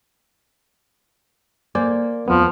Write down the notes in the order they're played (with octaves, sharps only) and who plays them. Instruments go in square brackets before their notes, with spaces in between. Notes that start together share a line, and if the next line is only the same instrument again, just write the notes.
[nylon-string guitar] A#3 [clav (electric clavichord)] C5 D5 G#5
[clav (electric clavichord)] F2 B3 [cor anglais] F3